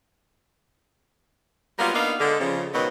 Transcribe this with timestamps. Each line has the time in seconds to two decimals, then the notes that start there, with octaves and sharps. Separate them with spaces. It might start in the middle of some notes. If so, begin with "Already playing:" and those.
1.79 F#3 G3 A#3 B3 F4 A#4
1.93 A#3 B3 D4 D#4 F5
2.20 D3 G#3
2.40 C#3 F3
2.74 G#2 B2 D#3 F3 F#3